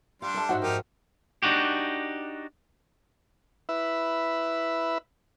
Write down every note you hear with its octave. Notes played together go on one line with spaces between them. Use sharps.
G3 D4 F5 C6
A4 E5 A5
G#2 D#4 F#4 C5 E5 F#5
F2 G#2 D#4 G4 A#4 F6
D4 D#4 F#4 G4
E4 B4 E5